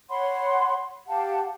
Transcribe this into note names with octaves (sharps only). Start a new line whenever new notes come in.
C#5 F#5 B5 C6
G4 F5 F#5 A5